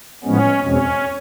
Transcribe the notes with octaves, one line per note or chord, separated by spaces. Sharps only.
A2 F3 G#3 B3 C#4
E2 B2 G#3 C4 C#4